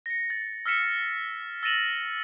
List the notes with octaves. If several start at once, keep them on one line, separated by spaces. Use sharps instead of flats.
A#6 C#7
A6
E6 F6 B6 C#7 E7
E6 A6 A#6 D#7 E7 F#7